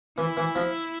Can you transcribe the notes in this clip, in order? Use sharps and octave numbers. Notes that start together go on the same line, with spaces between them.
E3 E4
E3
F3